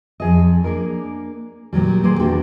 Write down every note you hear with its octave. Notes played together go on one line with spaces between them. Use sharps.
F2 G#4 D#5
A#3 D4 G#4 A#4
A#2 D#3 F#3 G3
A#3 G4 G#4 C5
E2 D4 F#4 G5